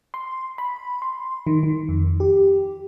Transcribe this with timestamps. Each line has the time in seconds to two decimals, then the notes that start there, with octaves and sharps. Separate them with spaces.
0.14 C6
0.58 B5
1.02 C6
1.47 D#3
1.63 D#3
1.89 F2
2.20 G4